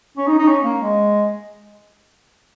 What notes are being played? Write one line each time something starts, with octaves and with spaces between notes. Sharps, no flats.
C#4
D#4
D#4
C#4
A#3
G#3